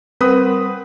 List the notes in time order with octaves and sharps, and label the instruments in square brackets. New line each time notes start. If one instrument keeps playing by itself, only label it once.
[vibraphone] G3 A#4 F#5 [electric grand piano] C4 D#6 [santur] B4